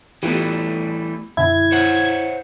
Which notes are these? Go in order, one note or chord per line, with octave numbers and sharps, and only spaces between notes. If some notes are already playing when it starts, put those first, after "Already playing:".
E3 G3 A3 B3 F4 G4
F#2 B2 D3 E4 G#6
C5 C#5 F#5